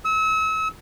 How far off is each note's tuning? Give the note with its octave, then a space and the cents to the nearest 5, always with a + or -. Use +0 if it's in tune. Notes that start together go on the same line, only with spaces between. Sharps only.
E6 -40